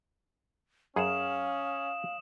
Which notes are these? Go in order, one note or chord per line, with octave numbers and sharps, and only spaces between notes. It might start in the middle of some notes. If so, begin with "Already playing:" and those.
F#2 C#4 G#4 F5 F#5 D#6 E7